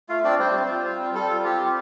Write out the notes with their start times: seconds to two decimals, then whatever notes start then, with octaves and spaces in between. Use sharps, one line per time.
0.09 A3 F4 F5
0.24 C4 D4 D5
0.39 G3 C4 C5
0.55 G3
0.69 F4
0.85 C4
0.99 G3
1.15 G3 A4
1.30 F4
1.44 C4 G4
1.60 G3